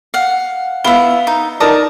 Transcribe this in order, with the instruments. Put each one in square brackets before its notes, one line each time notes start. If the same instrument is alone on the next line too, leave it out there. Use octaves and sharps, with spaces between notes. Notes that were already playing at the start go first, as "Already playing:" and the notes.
[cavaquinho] F5 F#5
[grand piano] B3 F5 G7 [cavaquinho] E4 E5
[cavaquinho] D#4
[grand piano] D#4 A#4 D5 [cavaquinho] A5 A#5 D#6